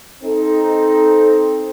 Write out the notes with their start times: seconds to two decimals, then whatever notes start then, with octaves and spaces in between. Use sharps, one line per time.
0.23 C4 D#4 A4